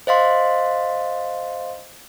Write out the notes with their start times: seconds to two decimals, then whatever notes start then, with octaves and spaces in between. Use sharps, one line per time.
0.07 C5 D#5 F5 C6